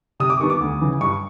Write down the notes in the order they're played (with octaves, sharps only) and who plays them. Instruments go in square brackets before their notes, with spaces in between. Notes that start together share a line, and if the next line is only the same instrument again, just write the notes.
[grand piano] C3 D#6
D6
D#3 G3 B3 D4 C#6
D6
D2
C#3 E3
G2 C#6